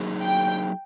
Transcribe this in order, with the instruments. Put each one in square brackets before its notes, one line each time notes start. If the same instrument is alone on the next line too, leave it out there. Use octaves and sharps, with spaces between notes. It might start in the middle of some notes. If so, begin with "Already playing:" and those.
Already playing: [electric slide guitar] F#3 A#3 D#4 G#4
[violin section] G5